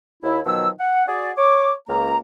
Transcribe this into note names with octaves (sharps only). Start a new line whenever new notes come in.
D#2 E4
B2 D#3 F3 F#3 E6
F#5
F#4 G#4 D5
C#5 D6
C#2 A#3 A#5